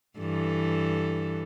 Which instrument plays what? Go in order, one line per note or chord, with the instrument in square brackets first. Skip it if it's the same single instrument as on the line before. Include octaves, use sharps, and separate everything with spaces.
[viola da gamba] G2 E3 A4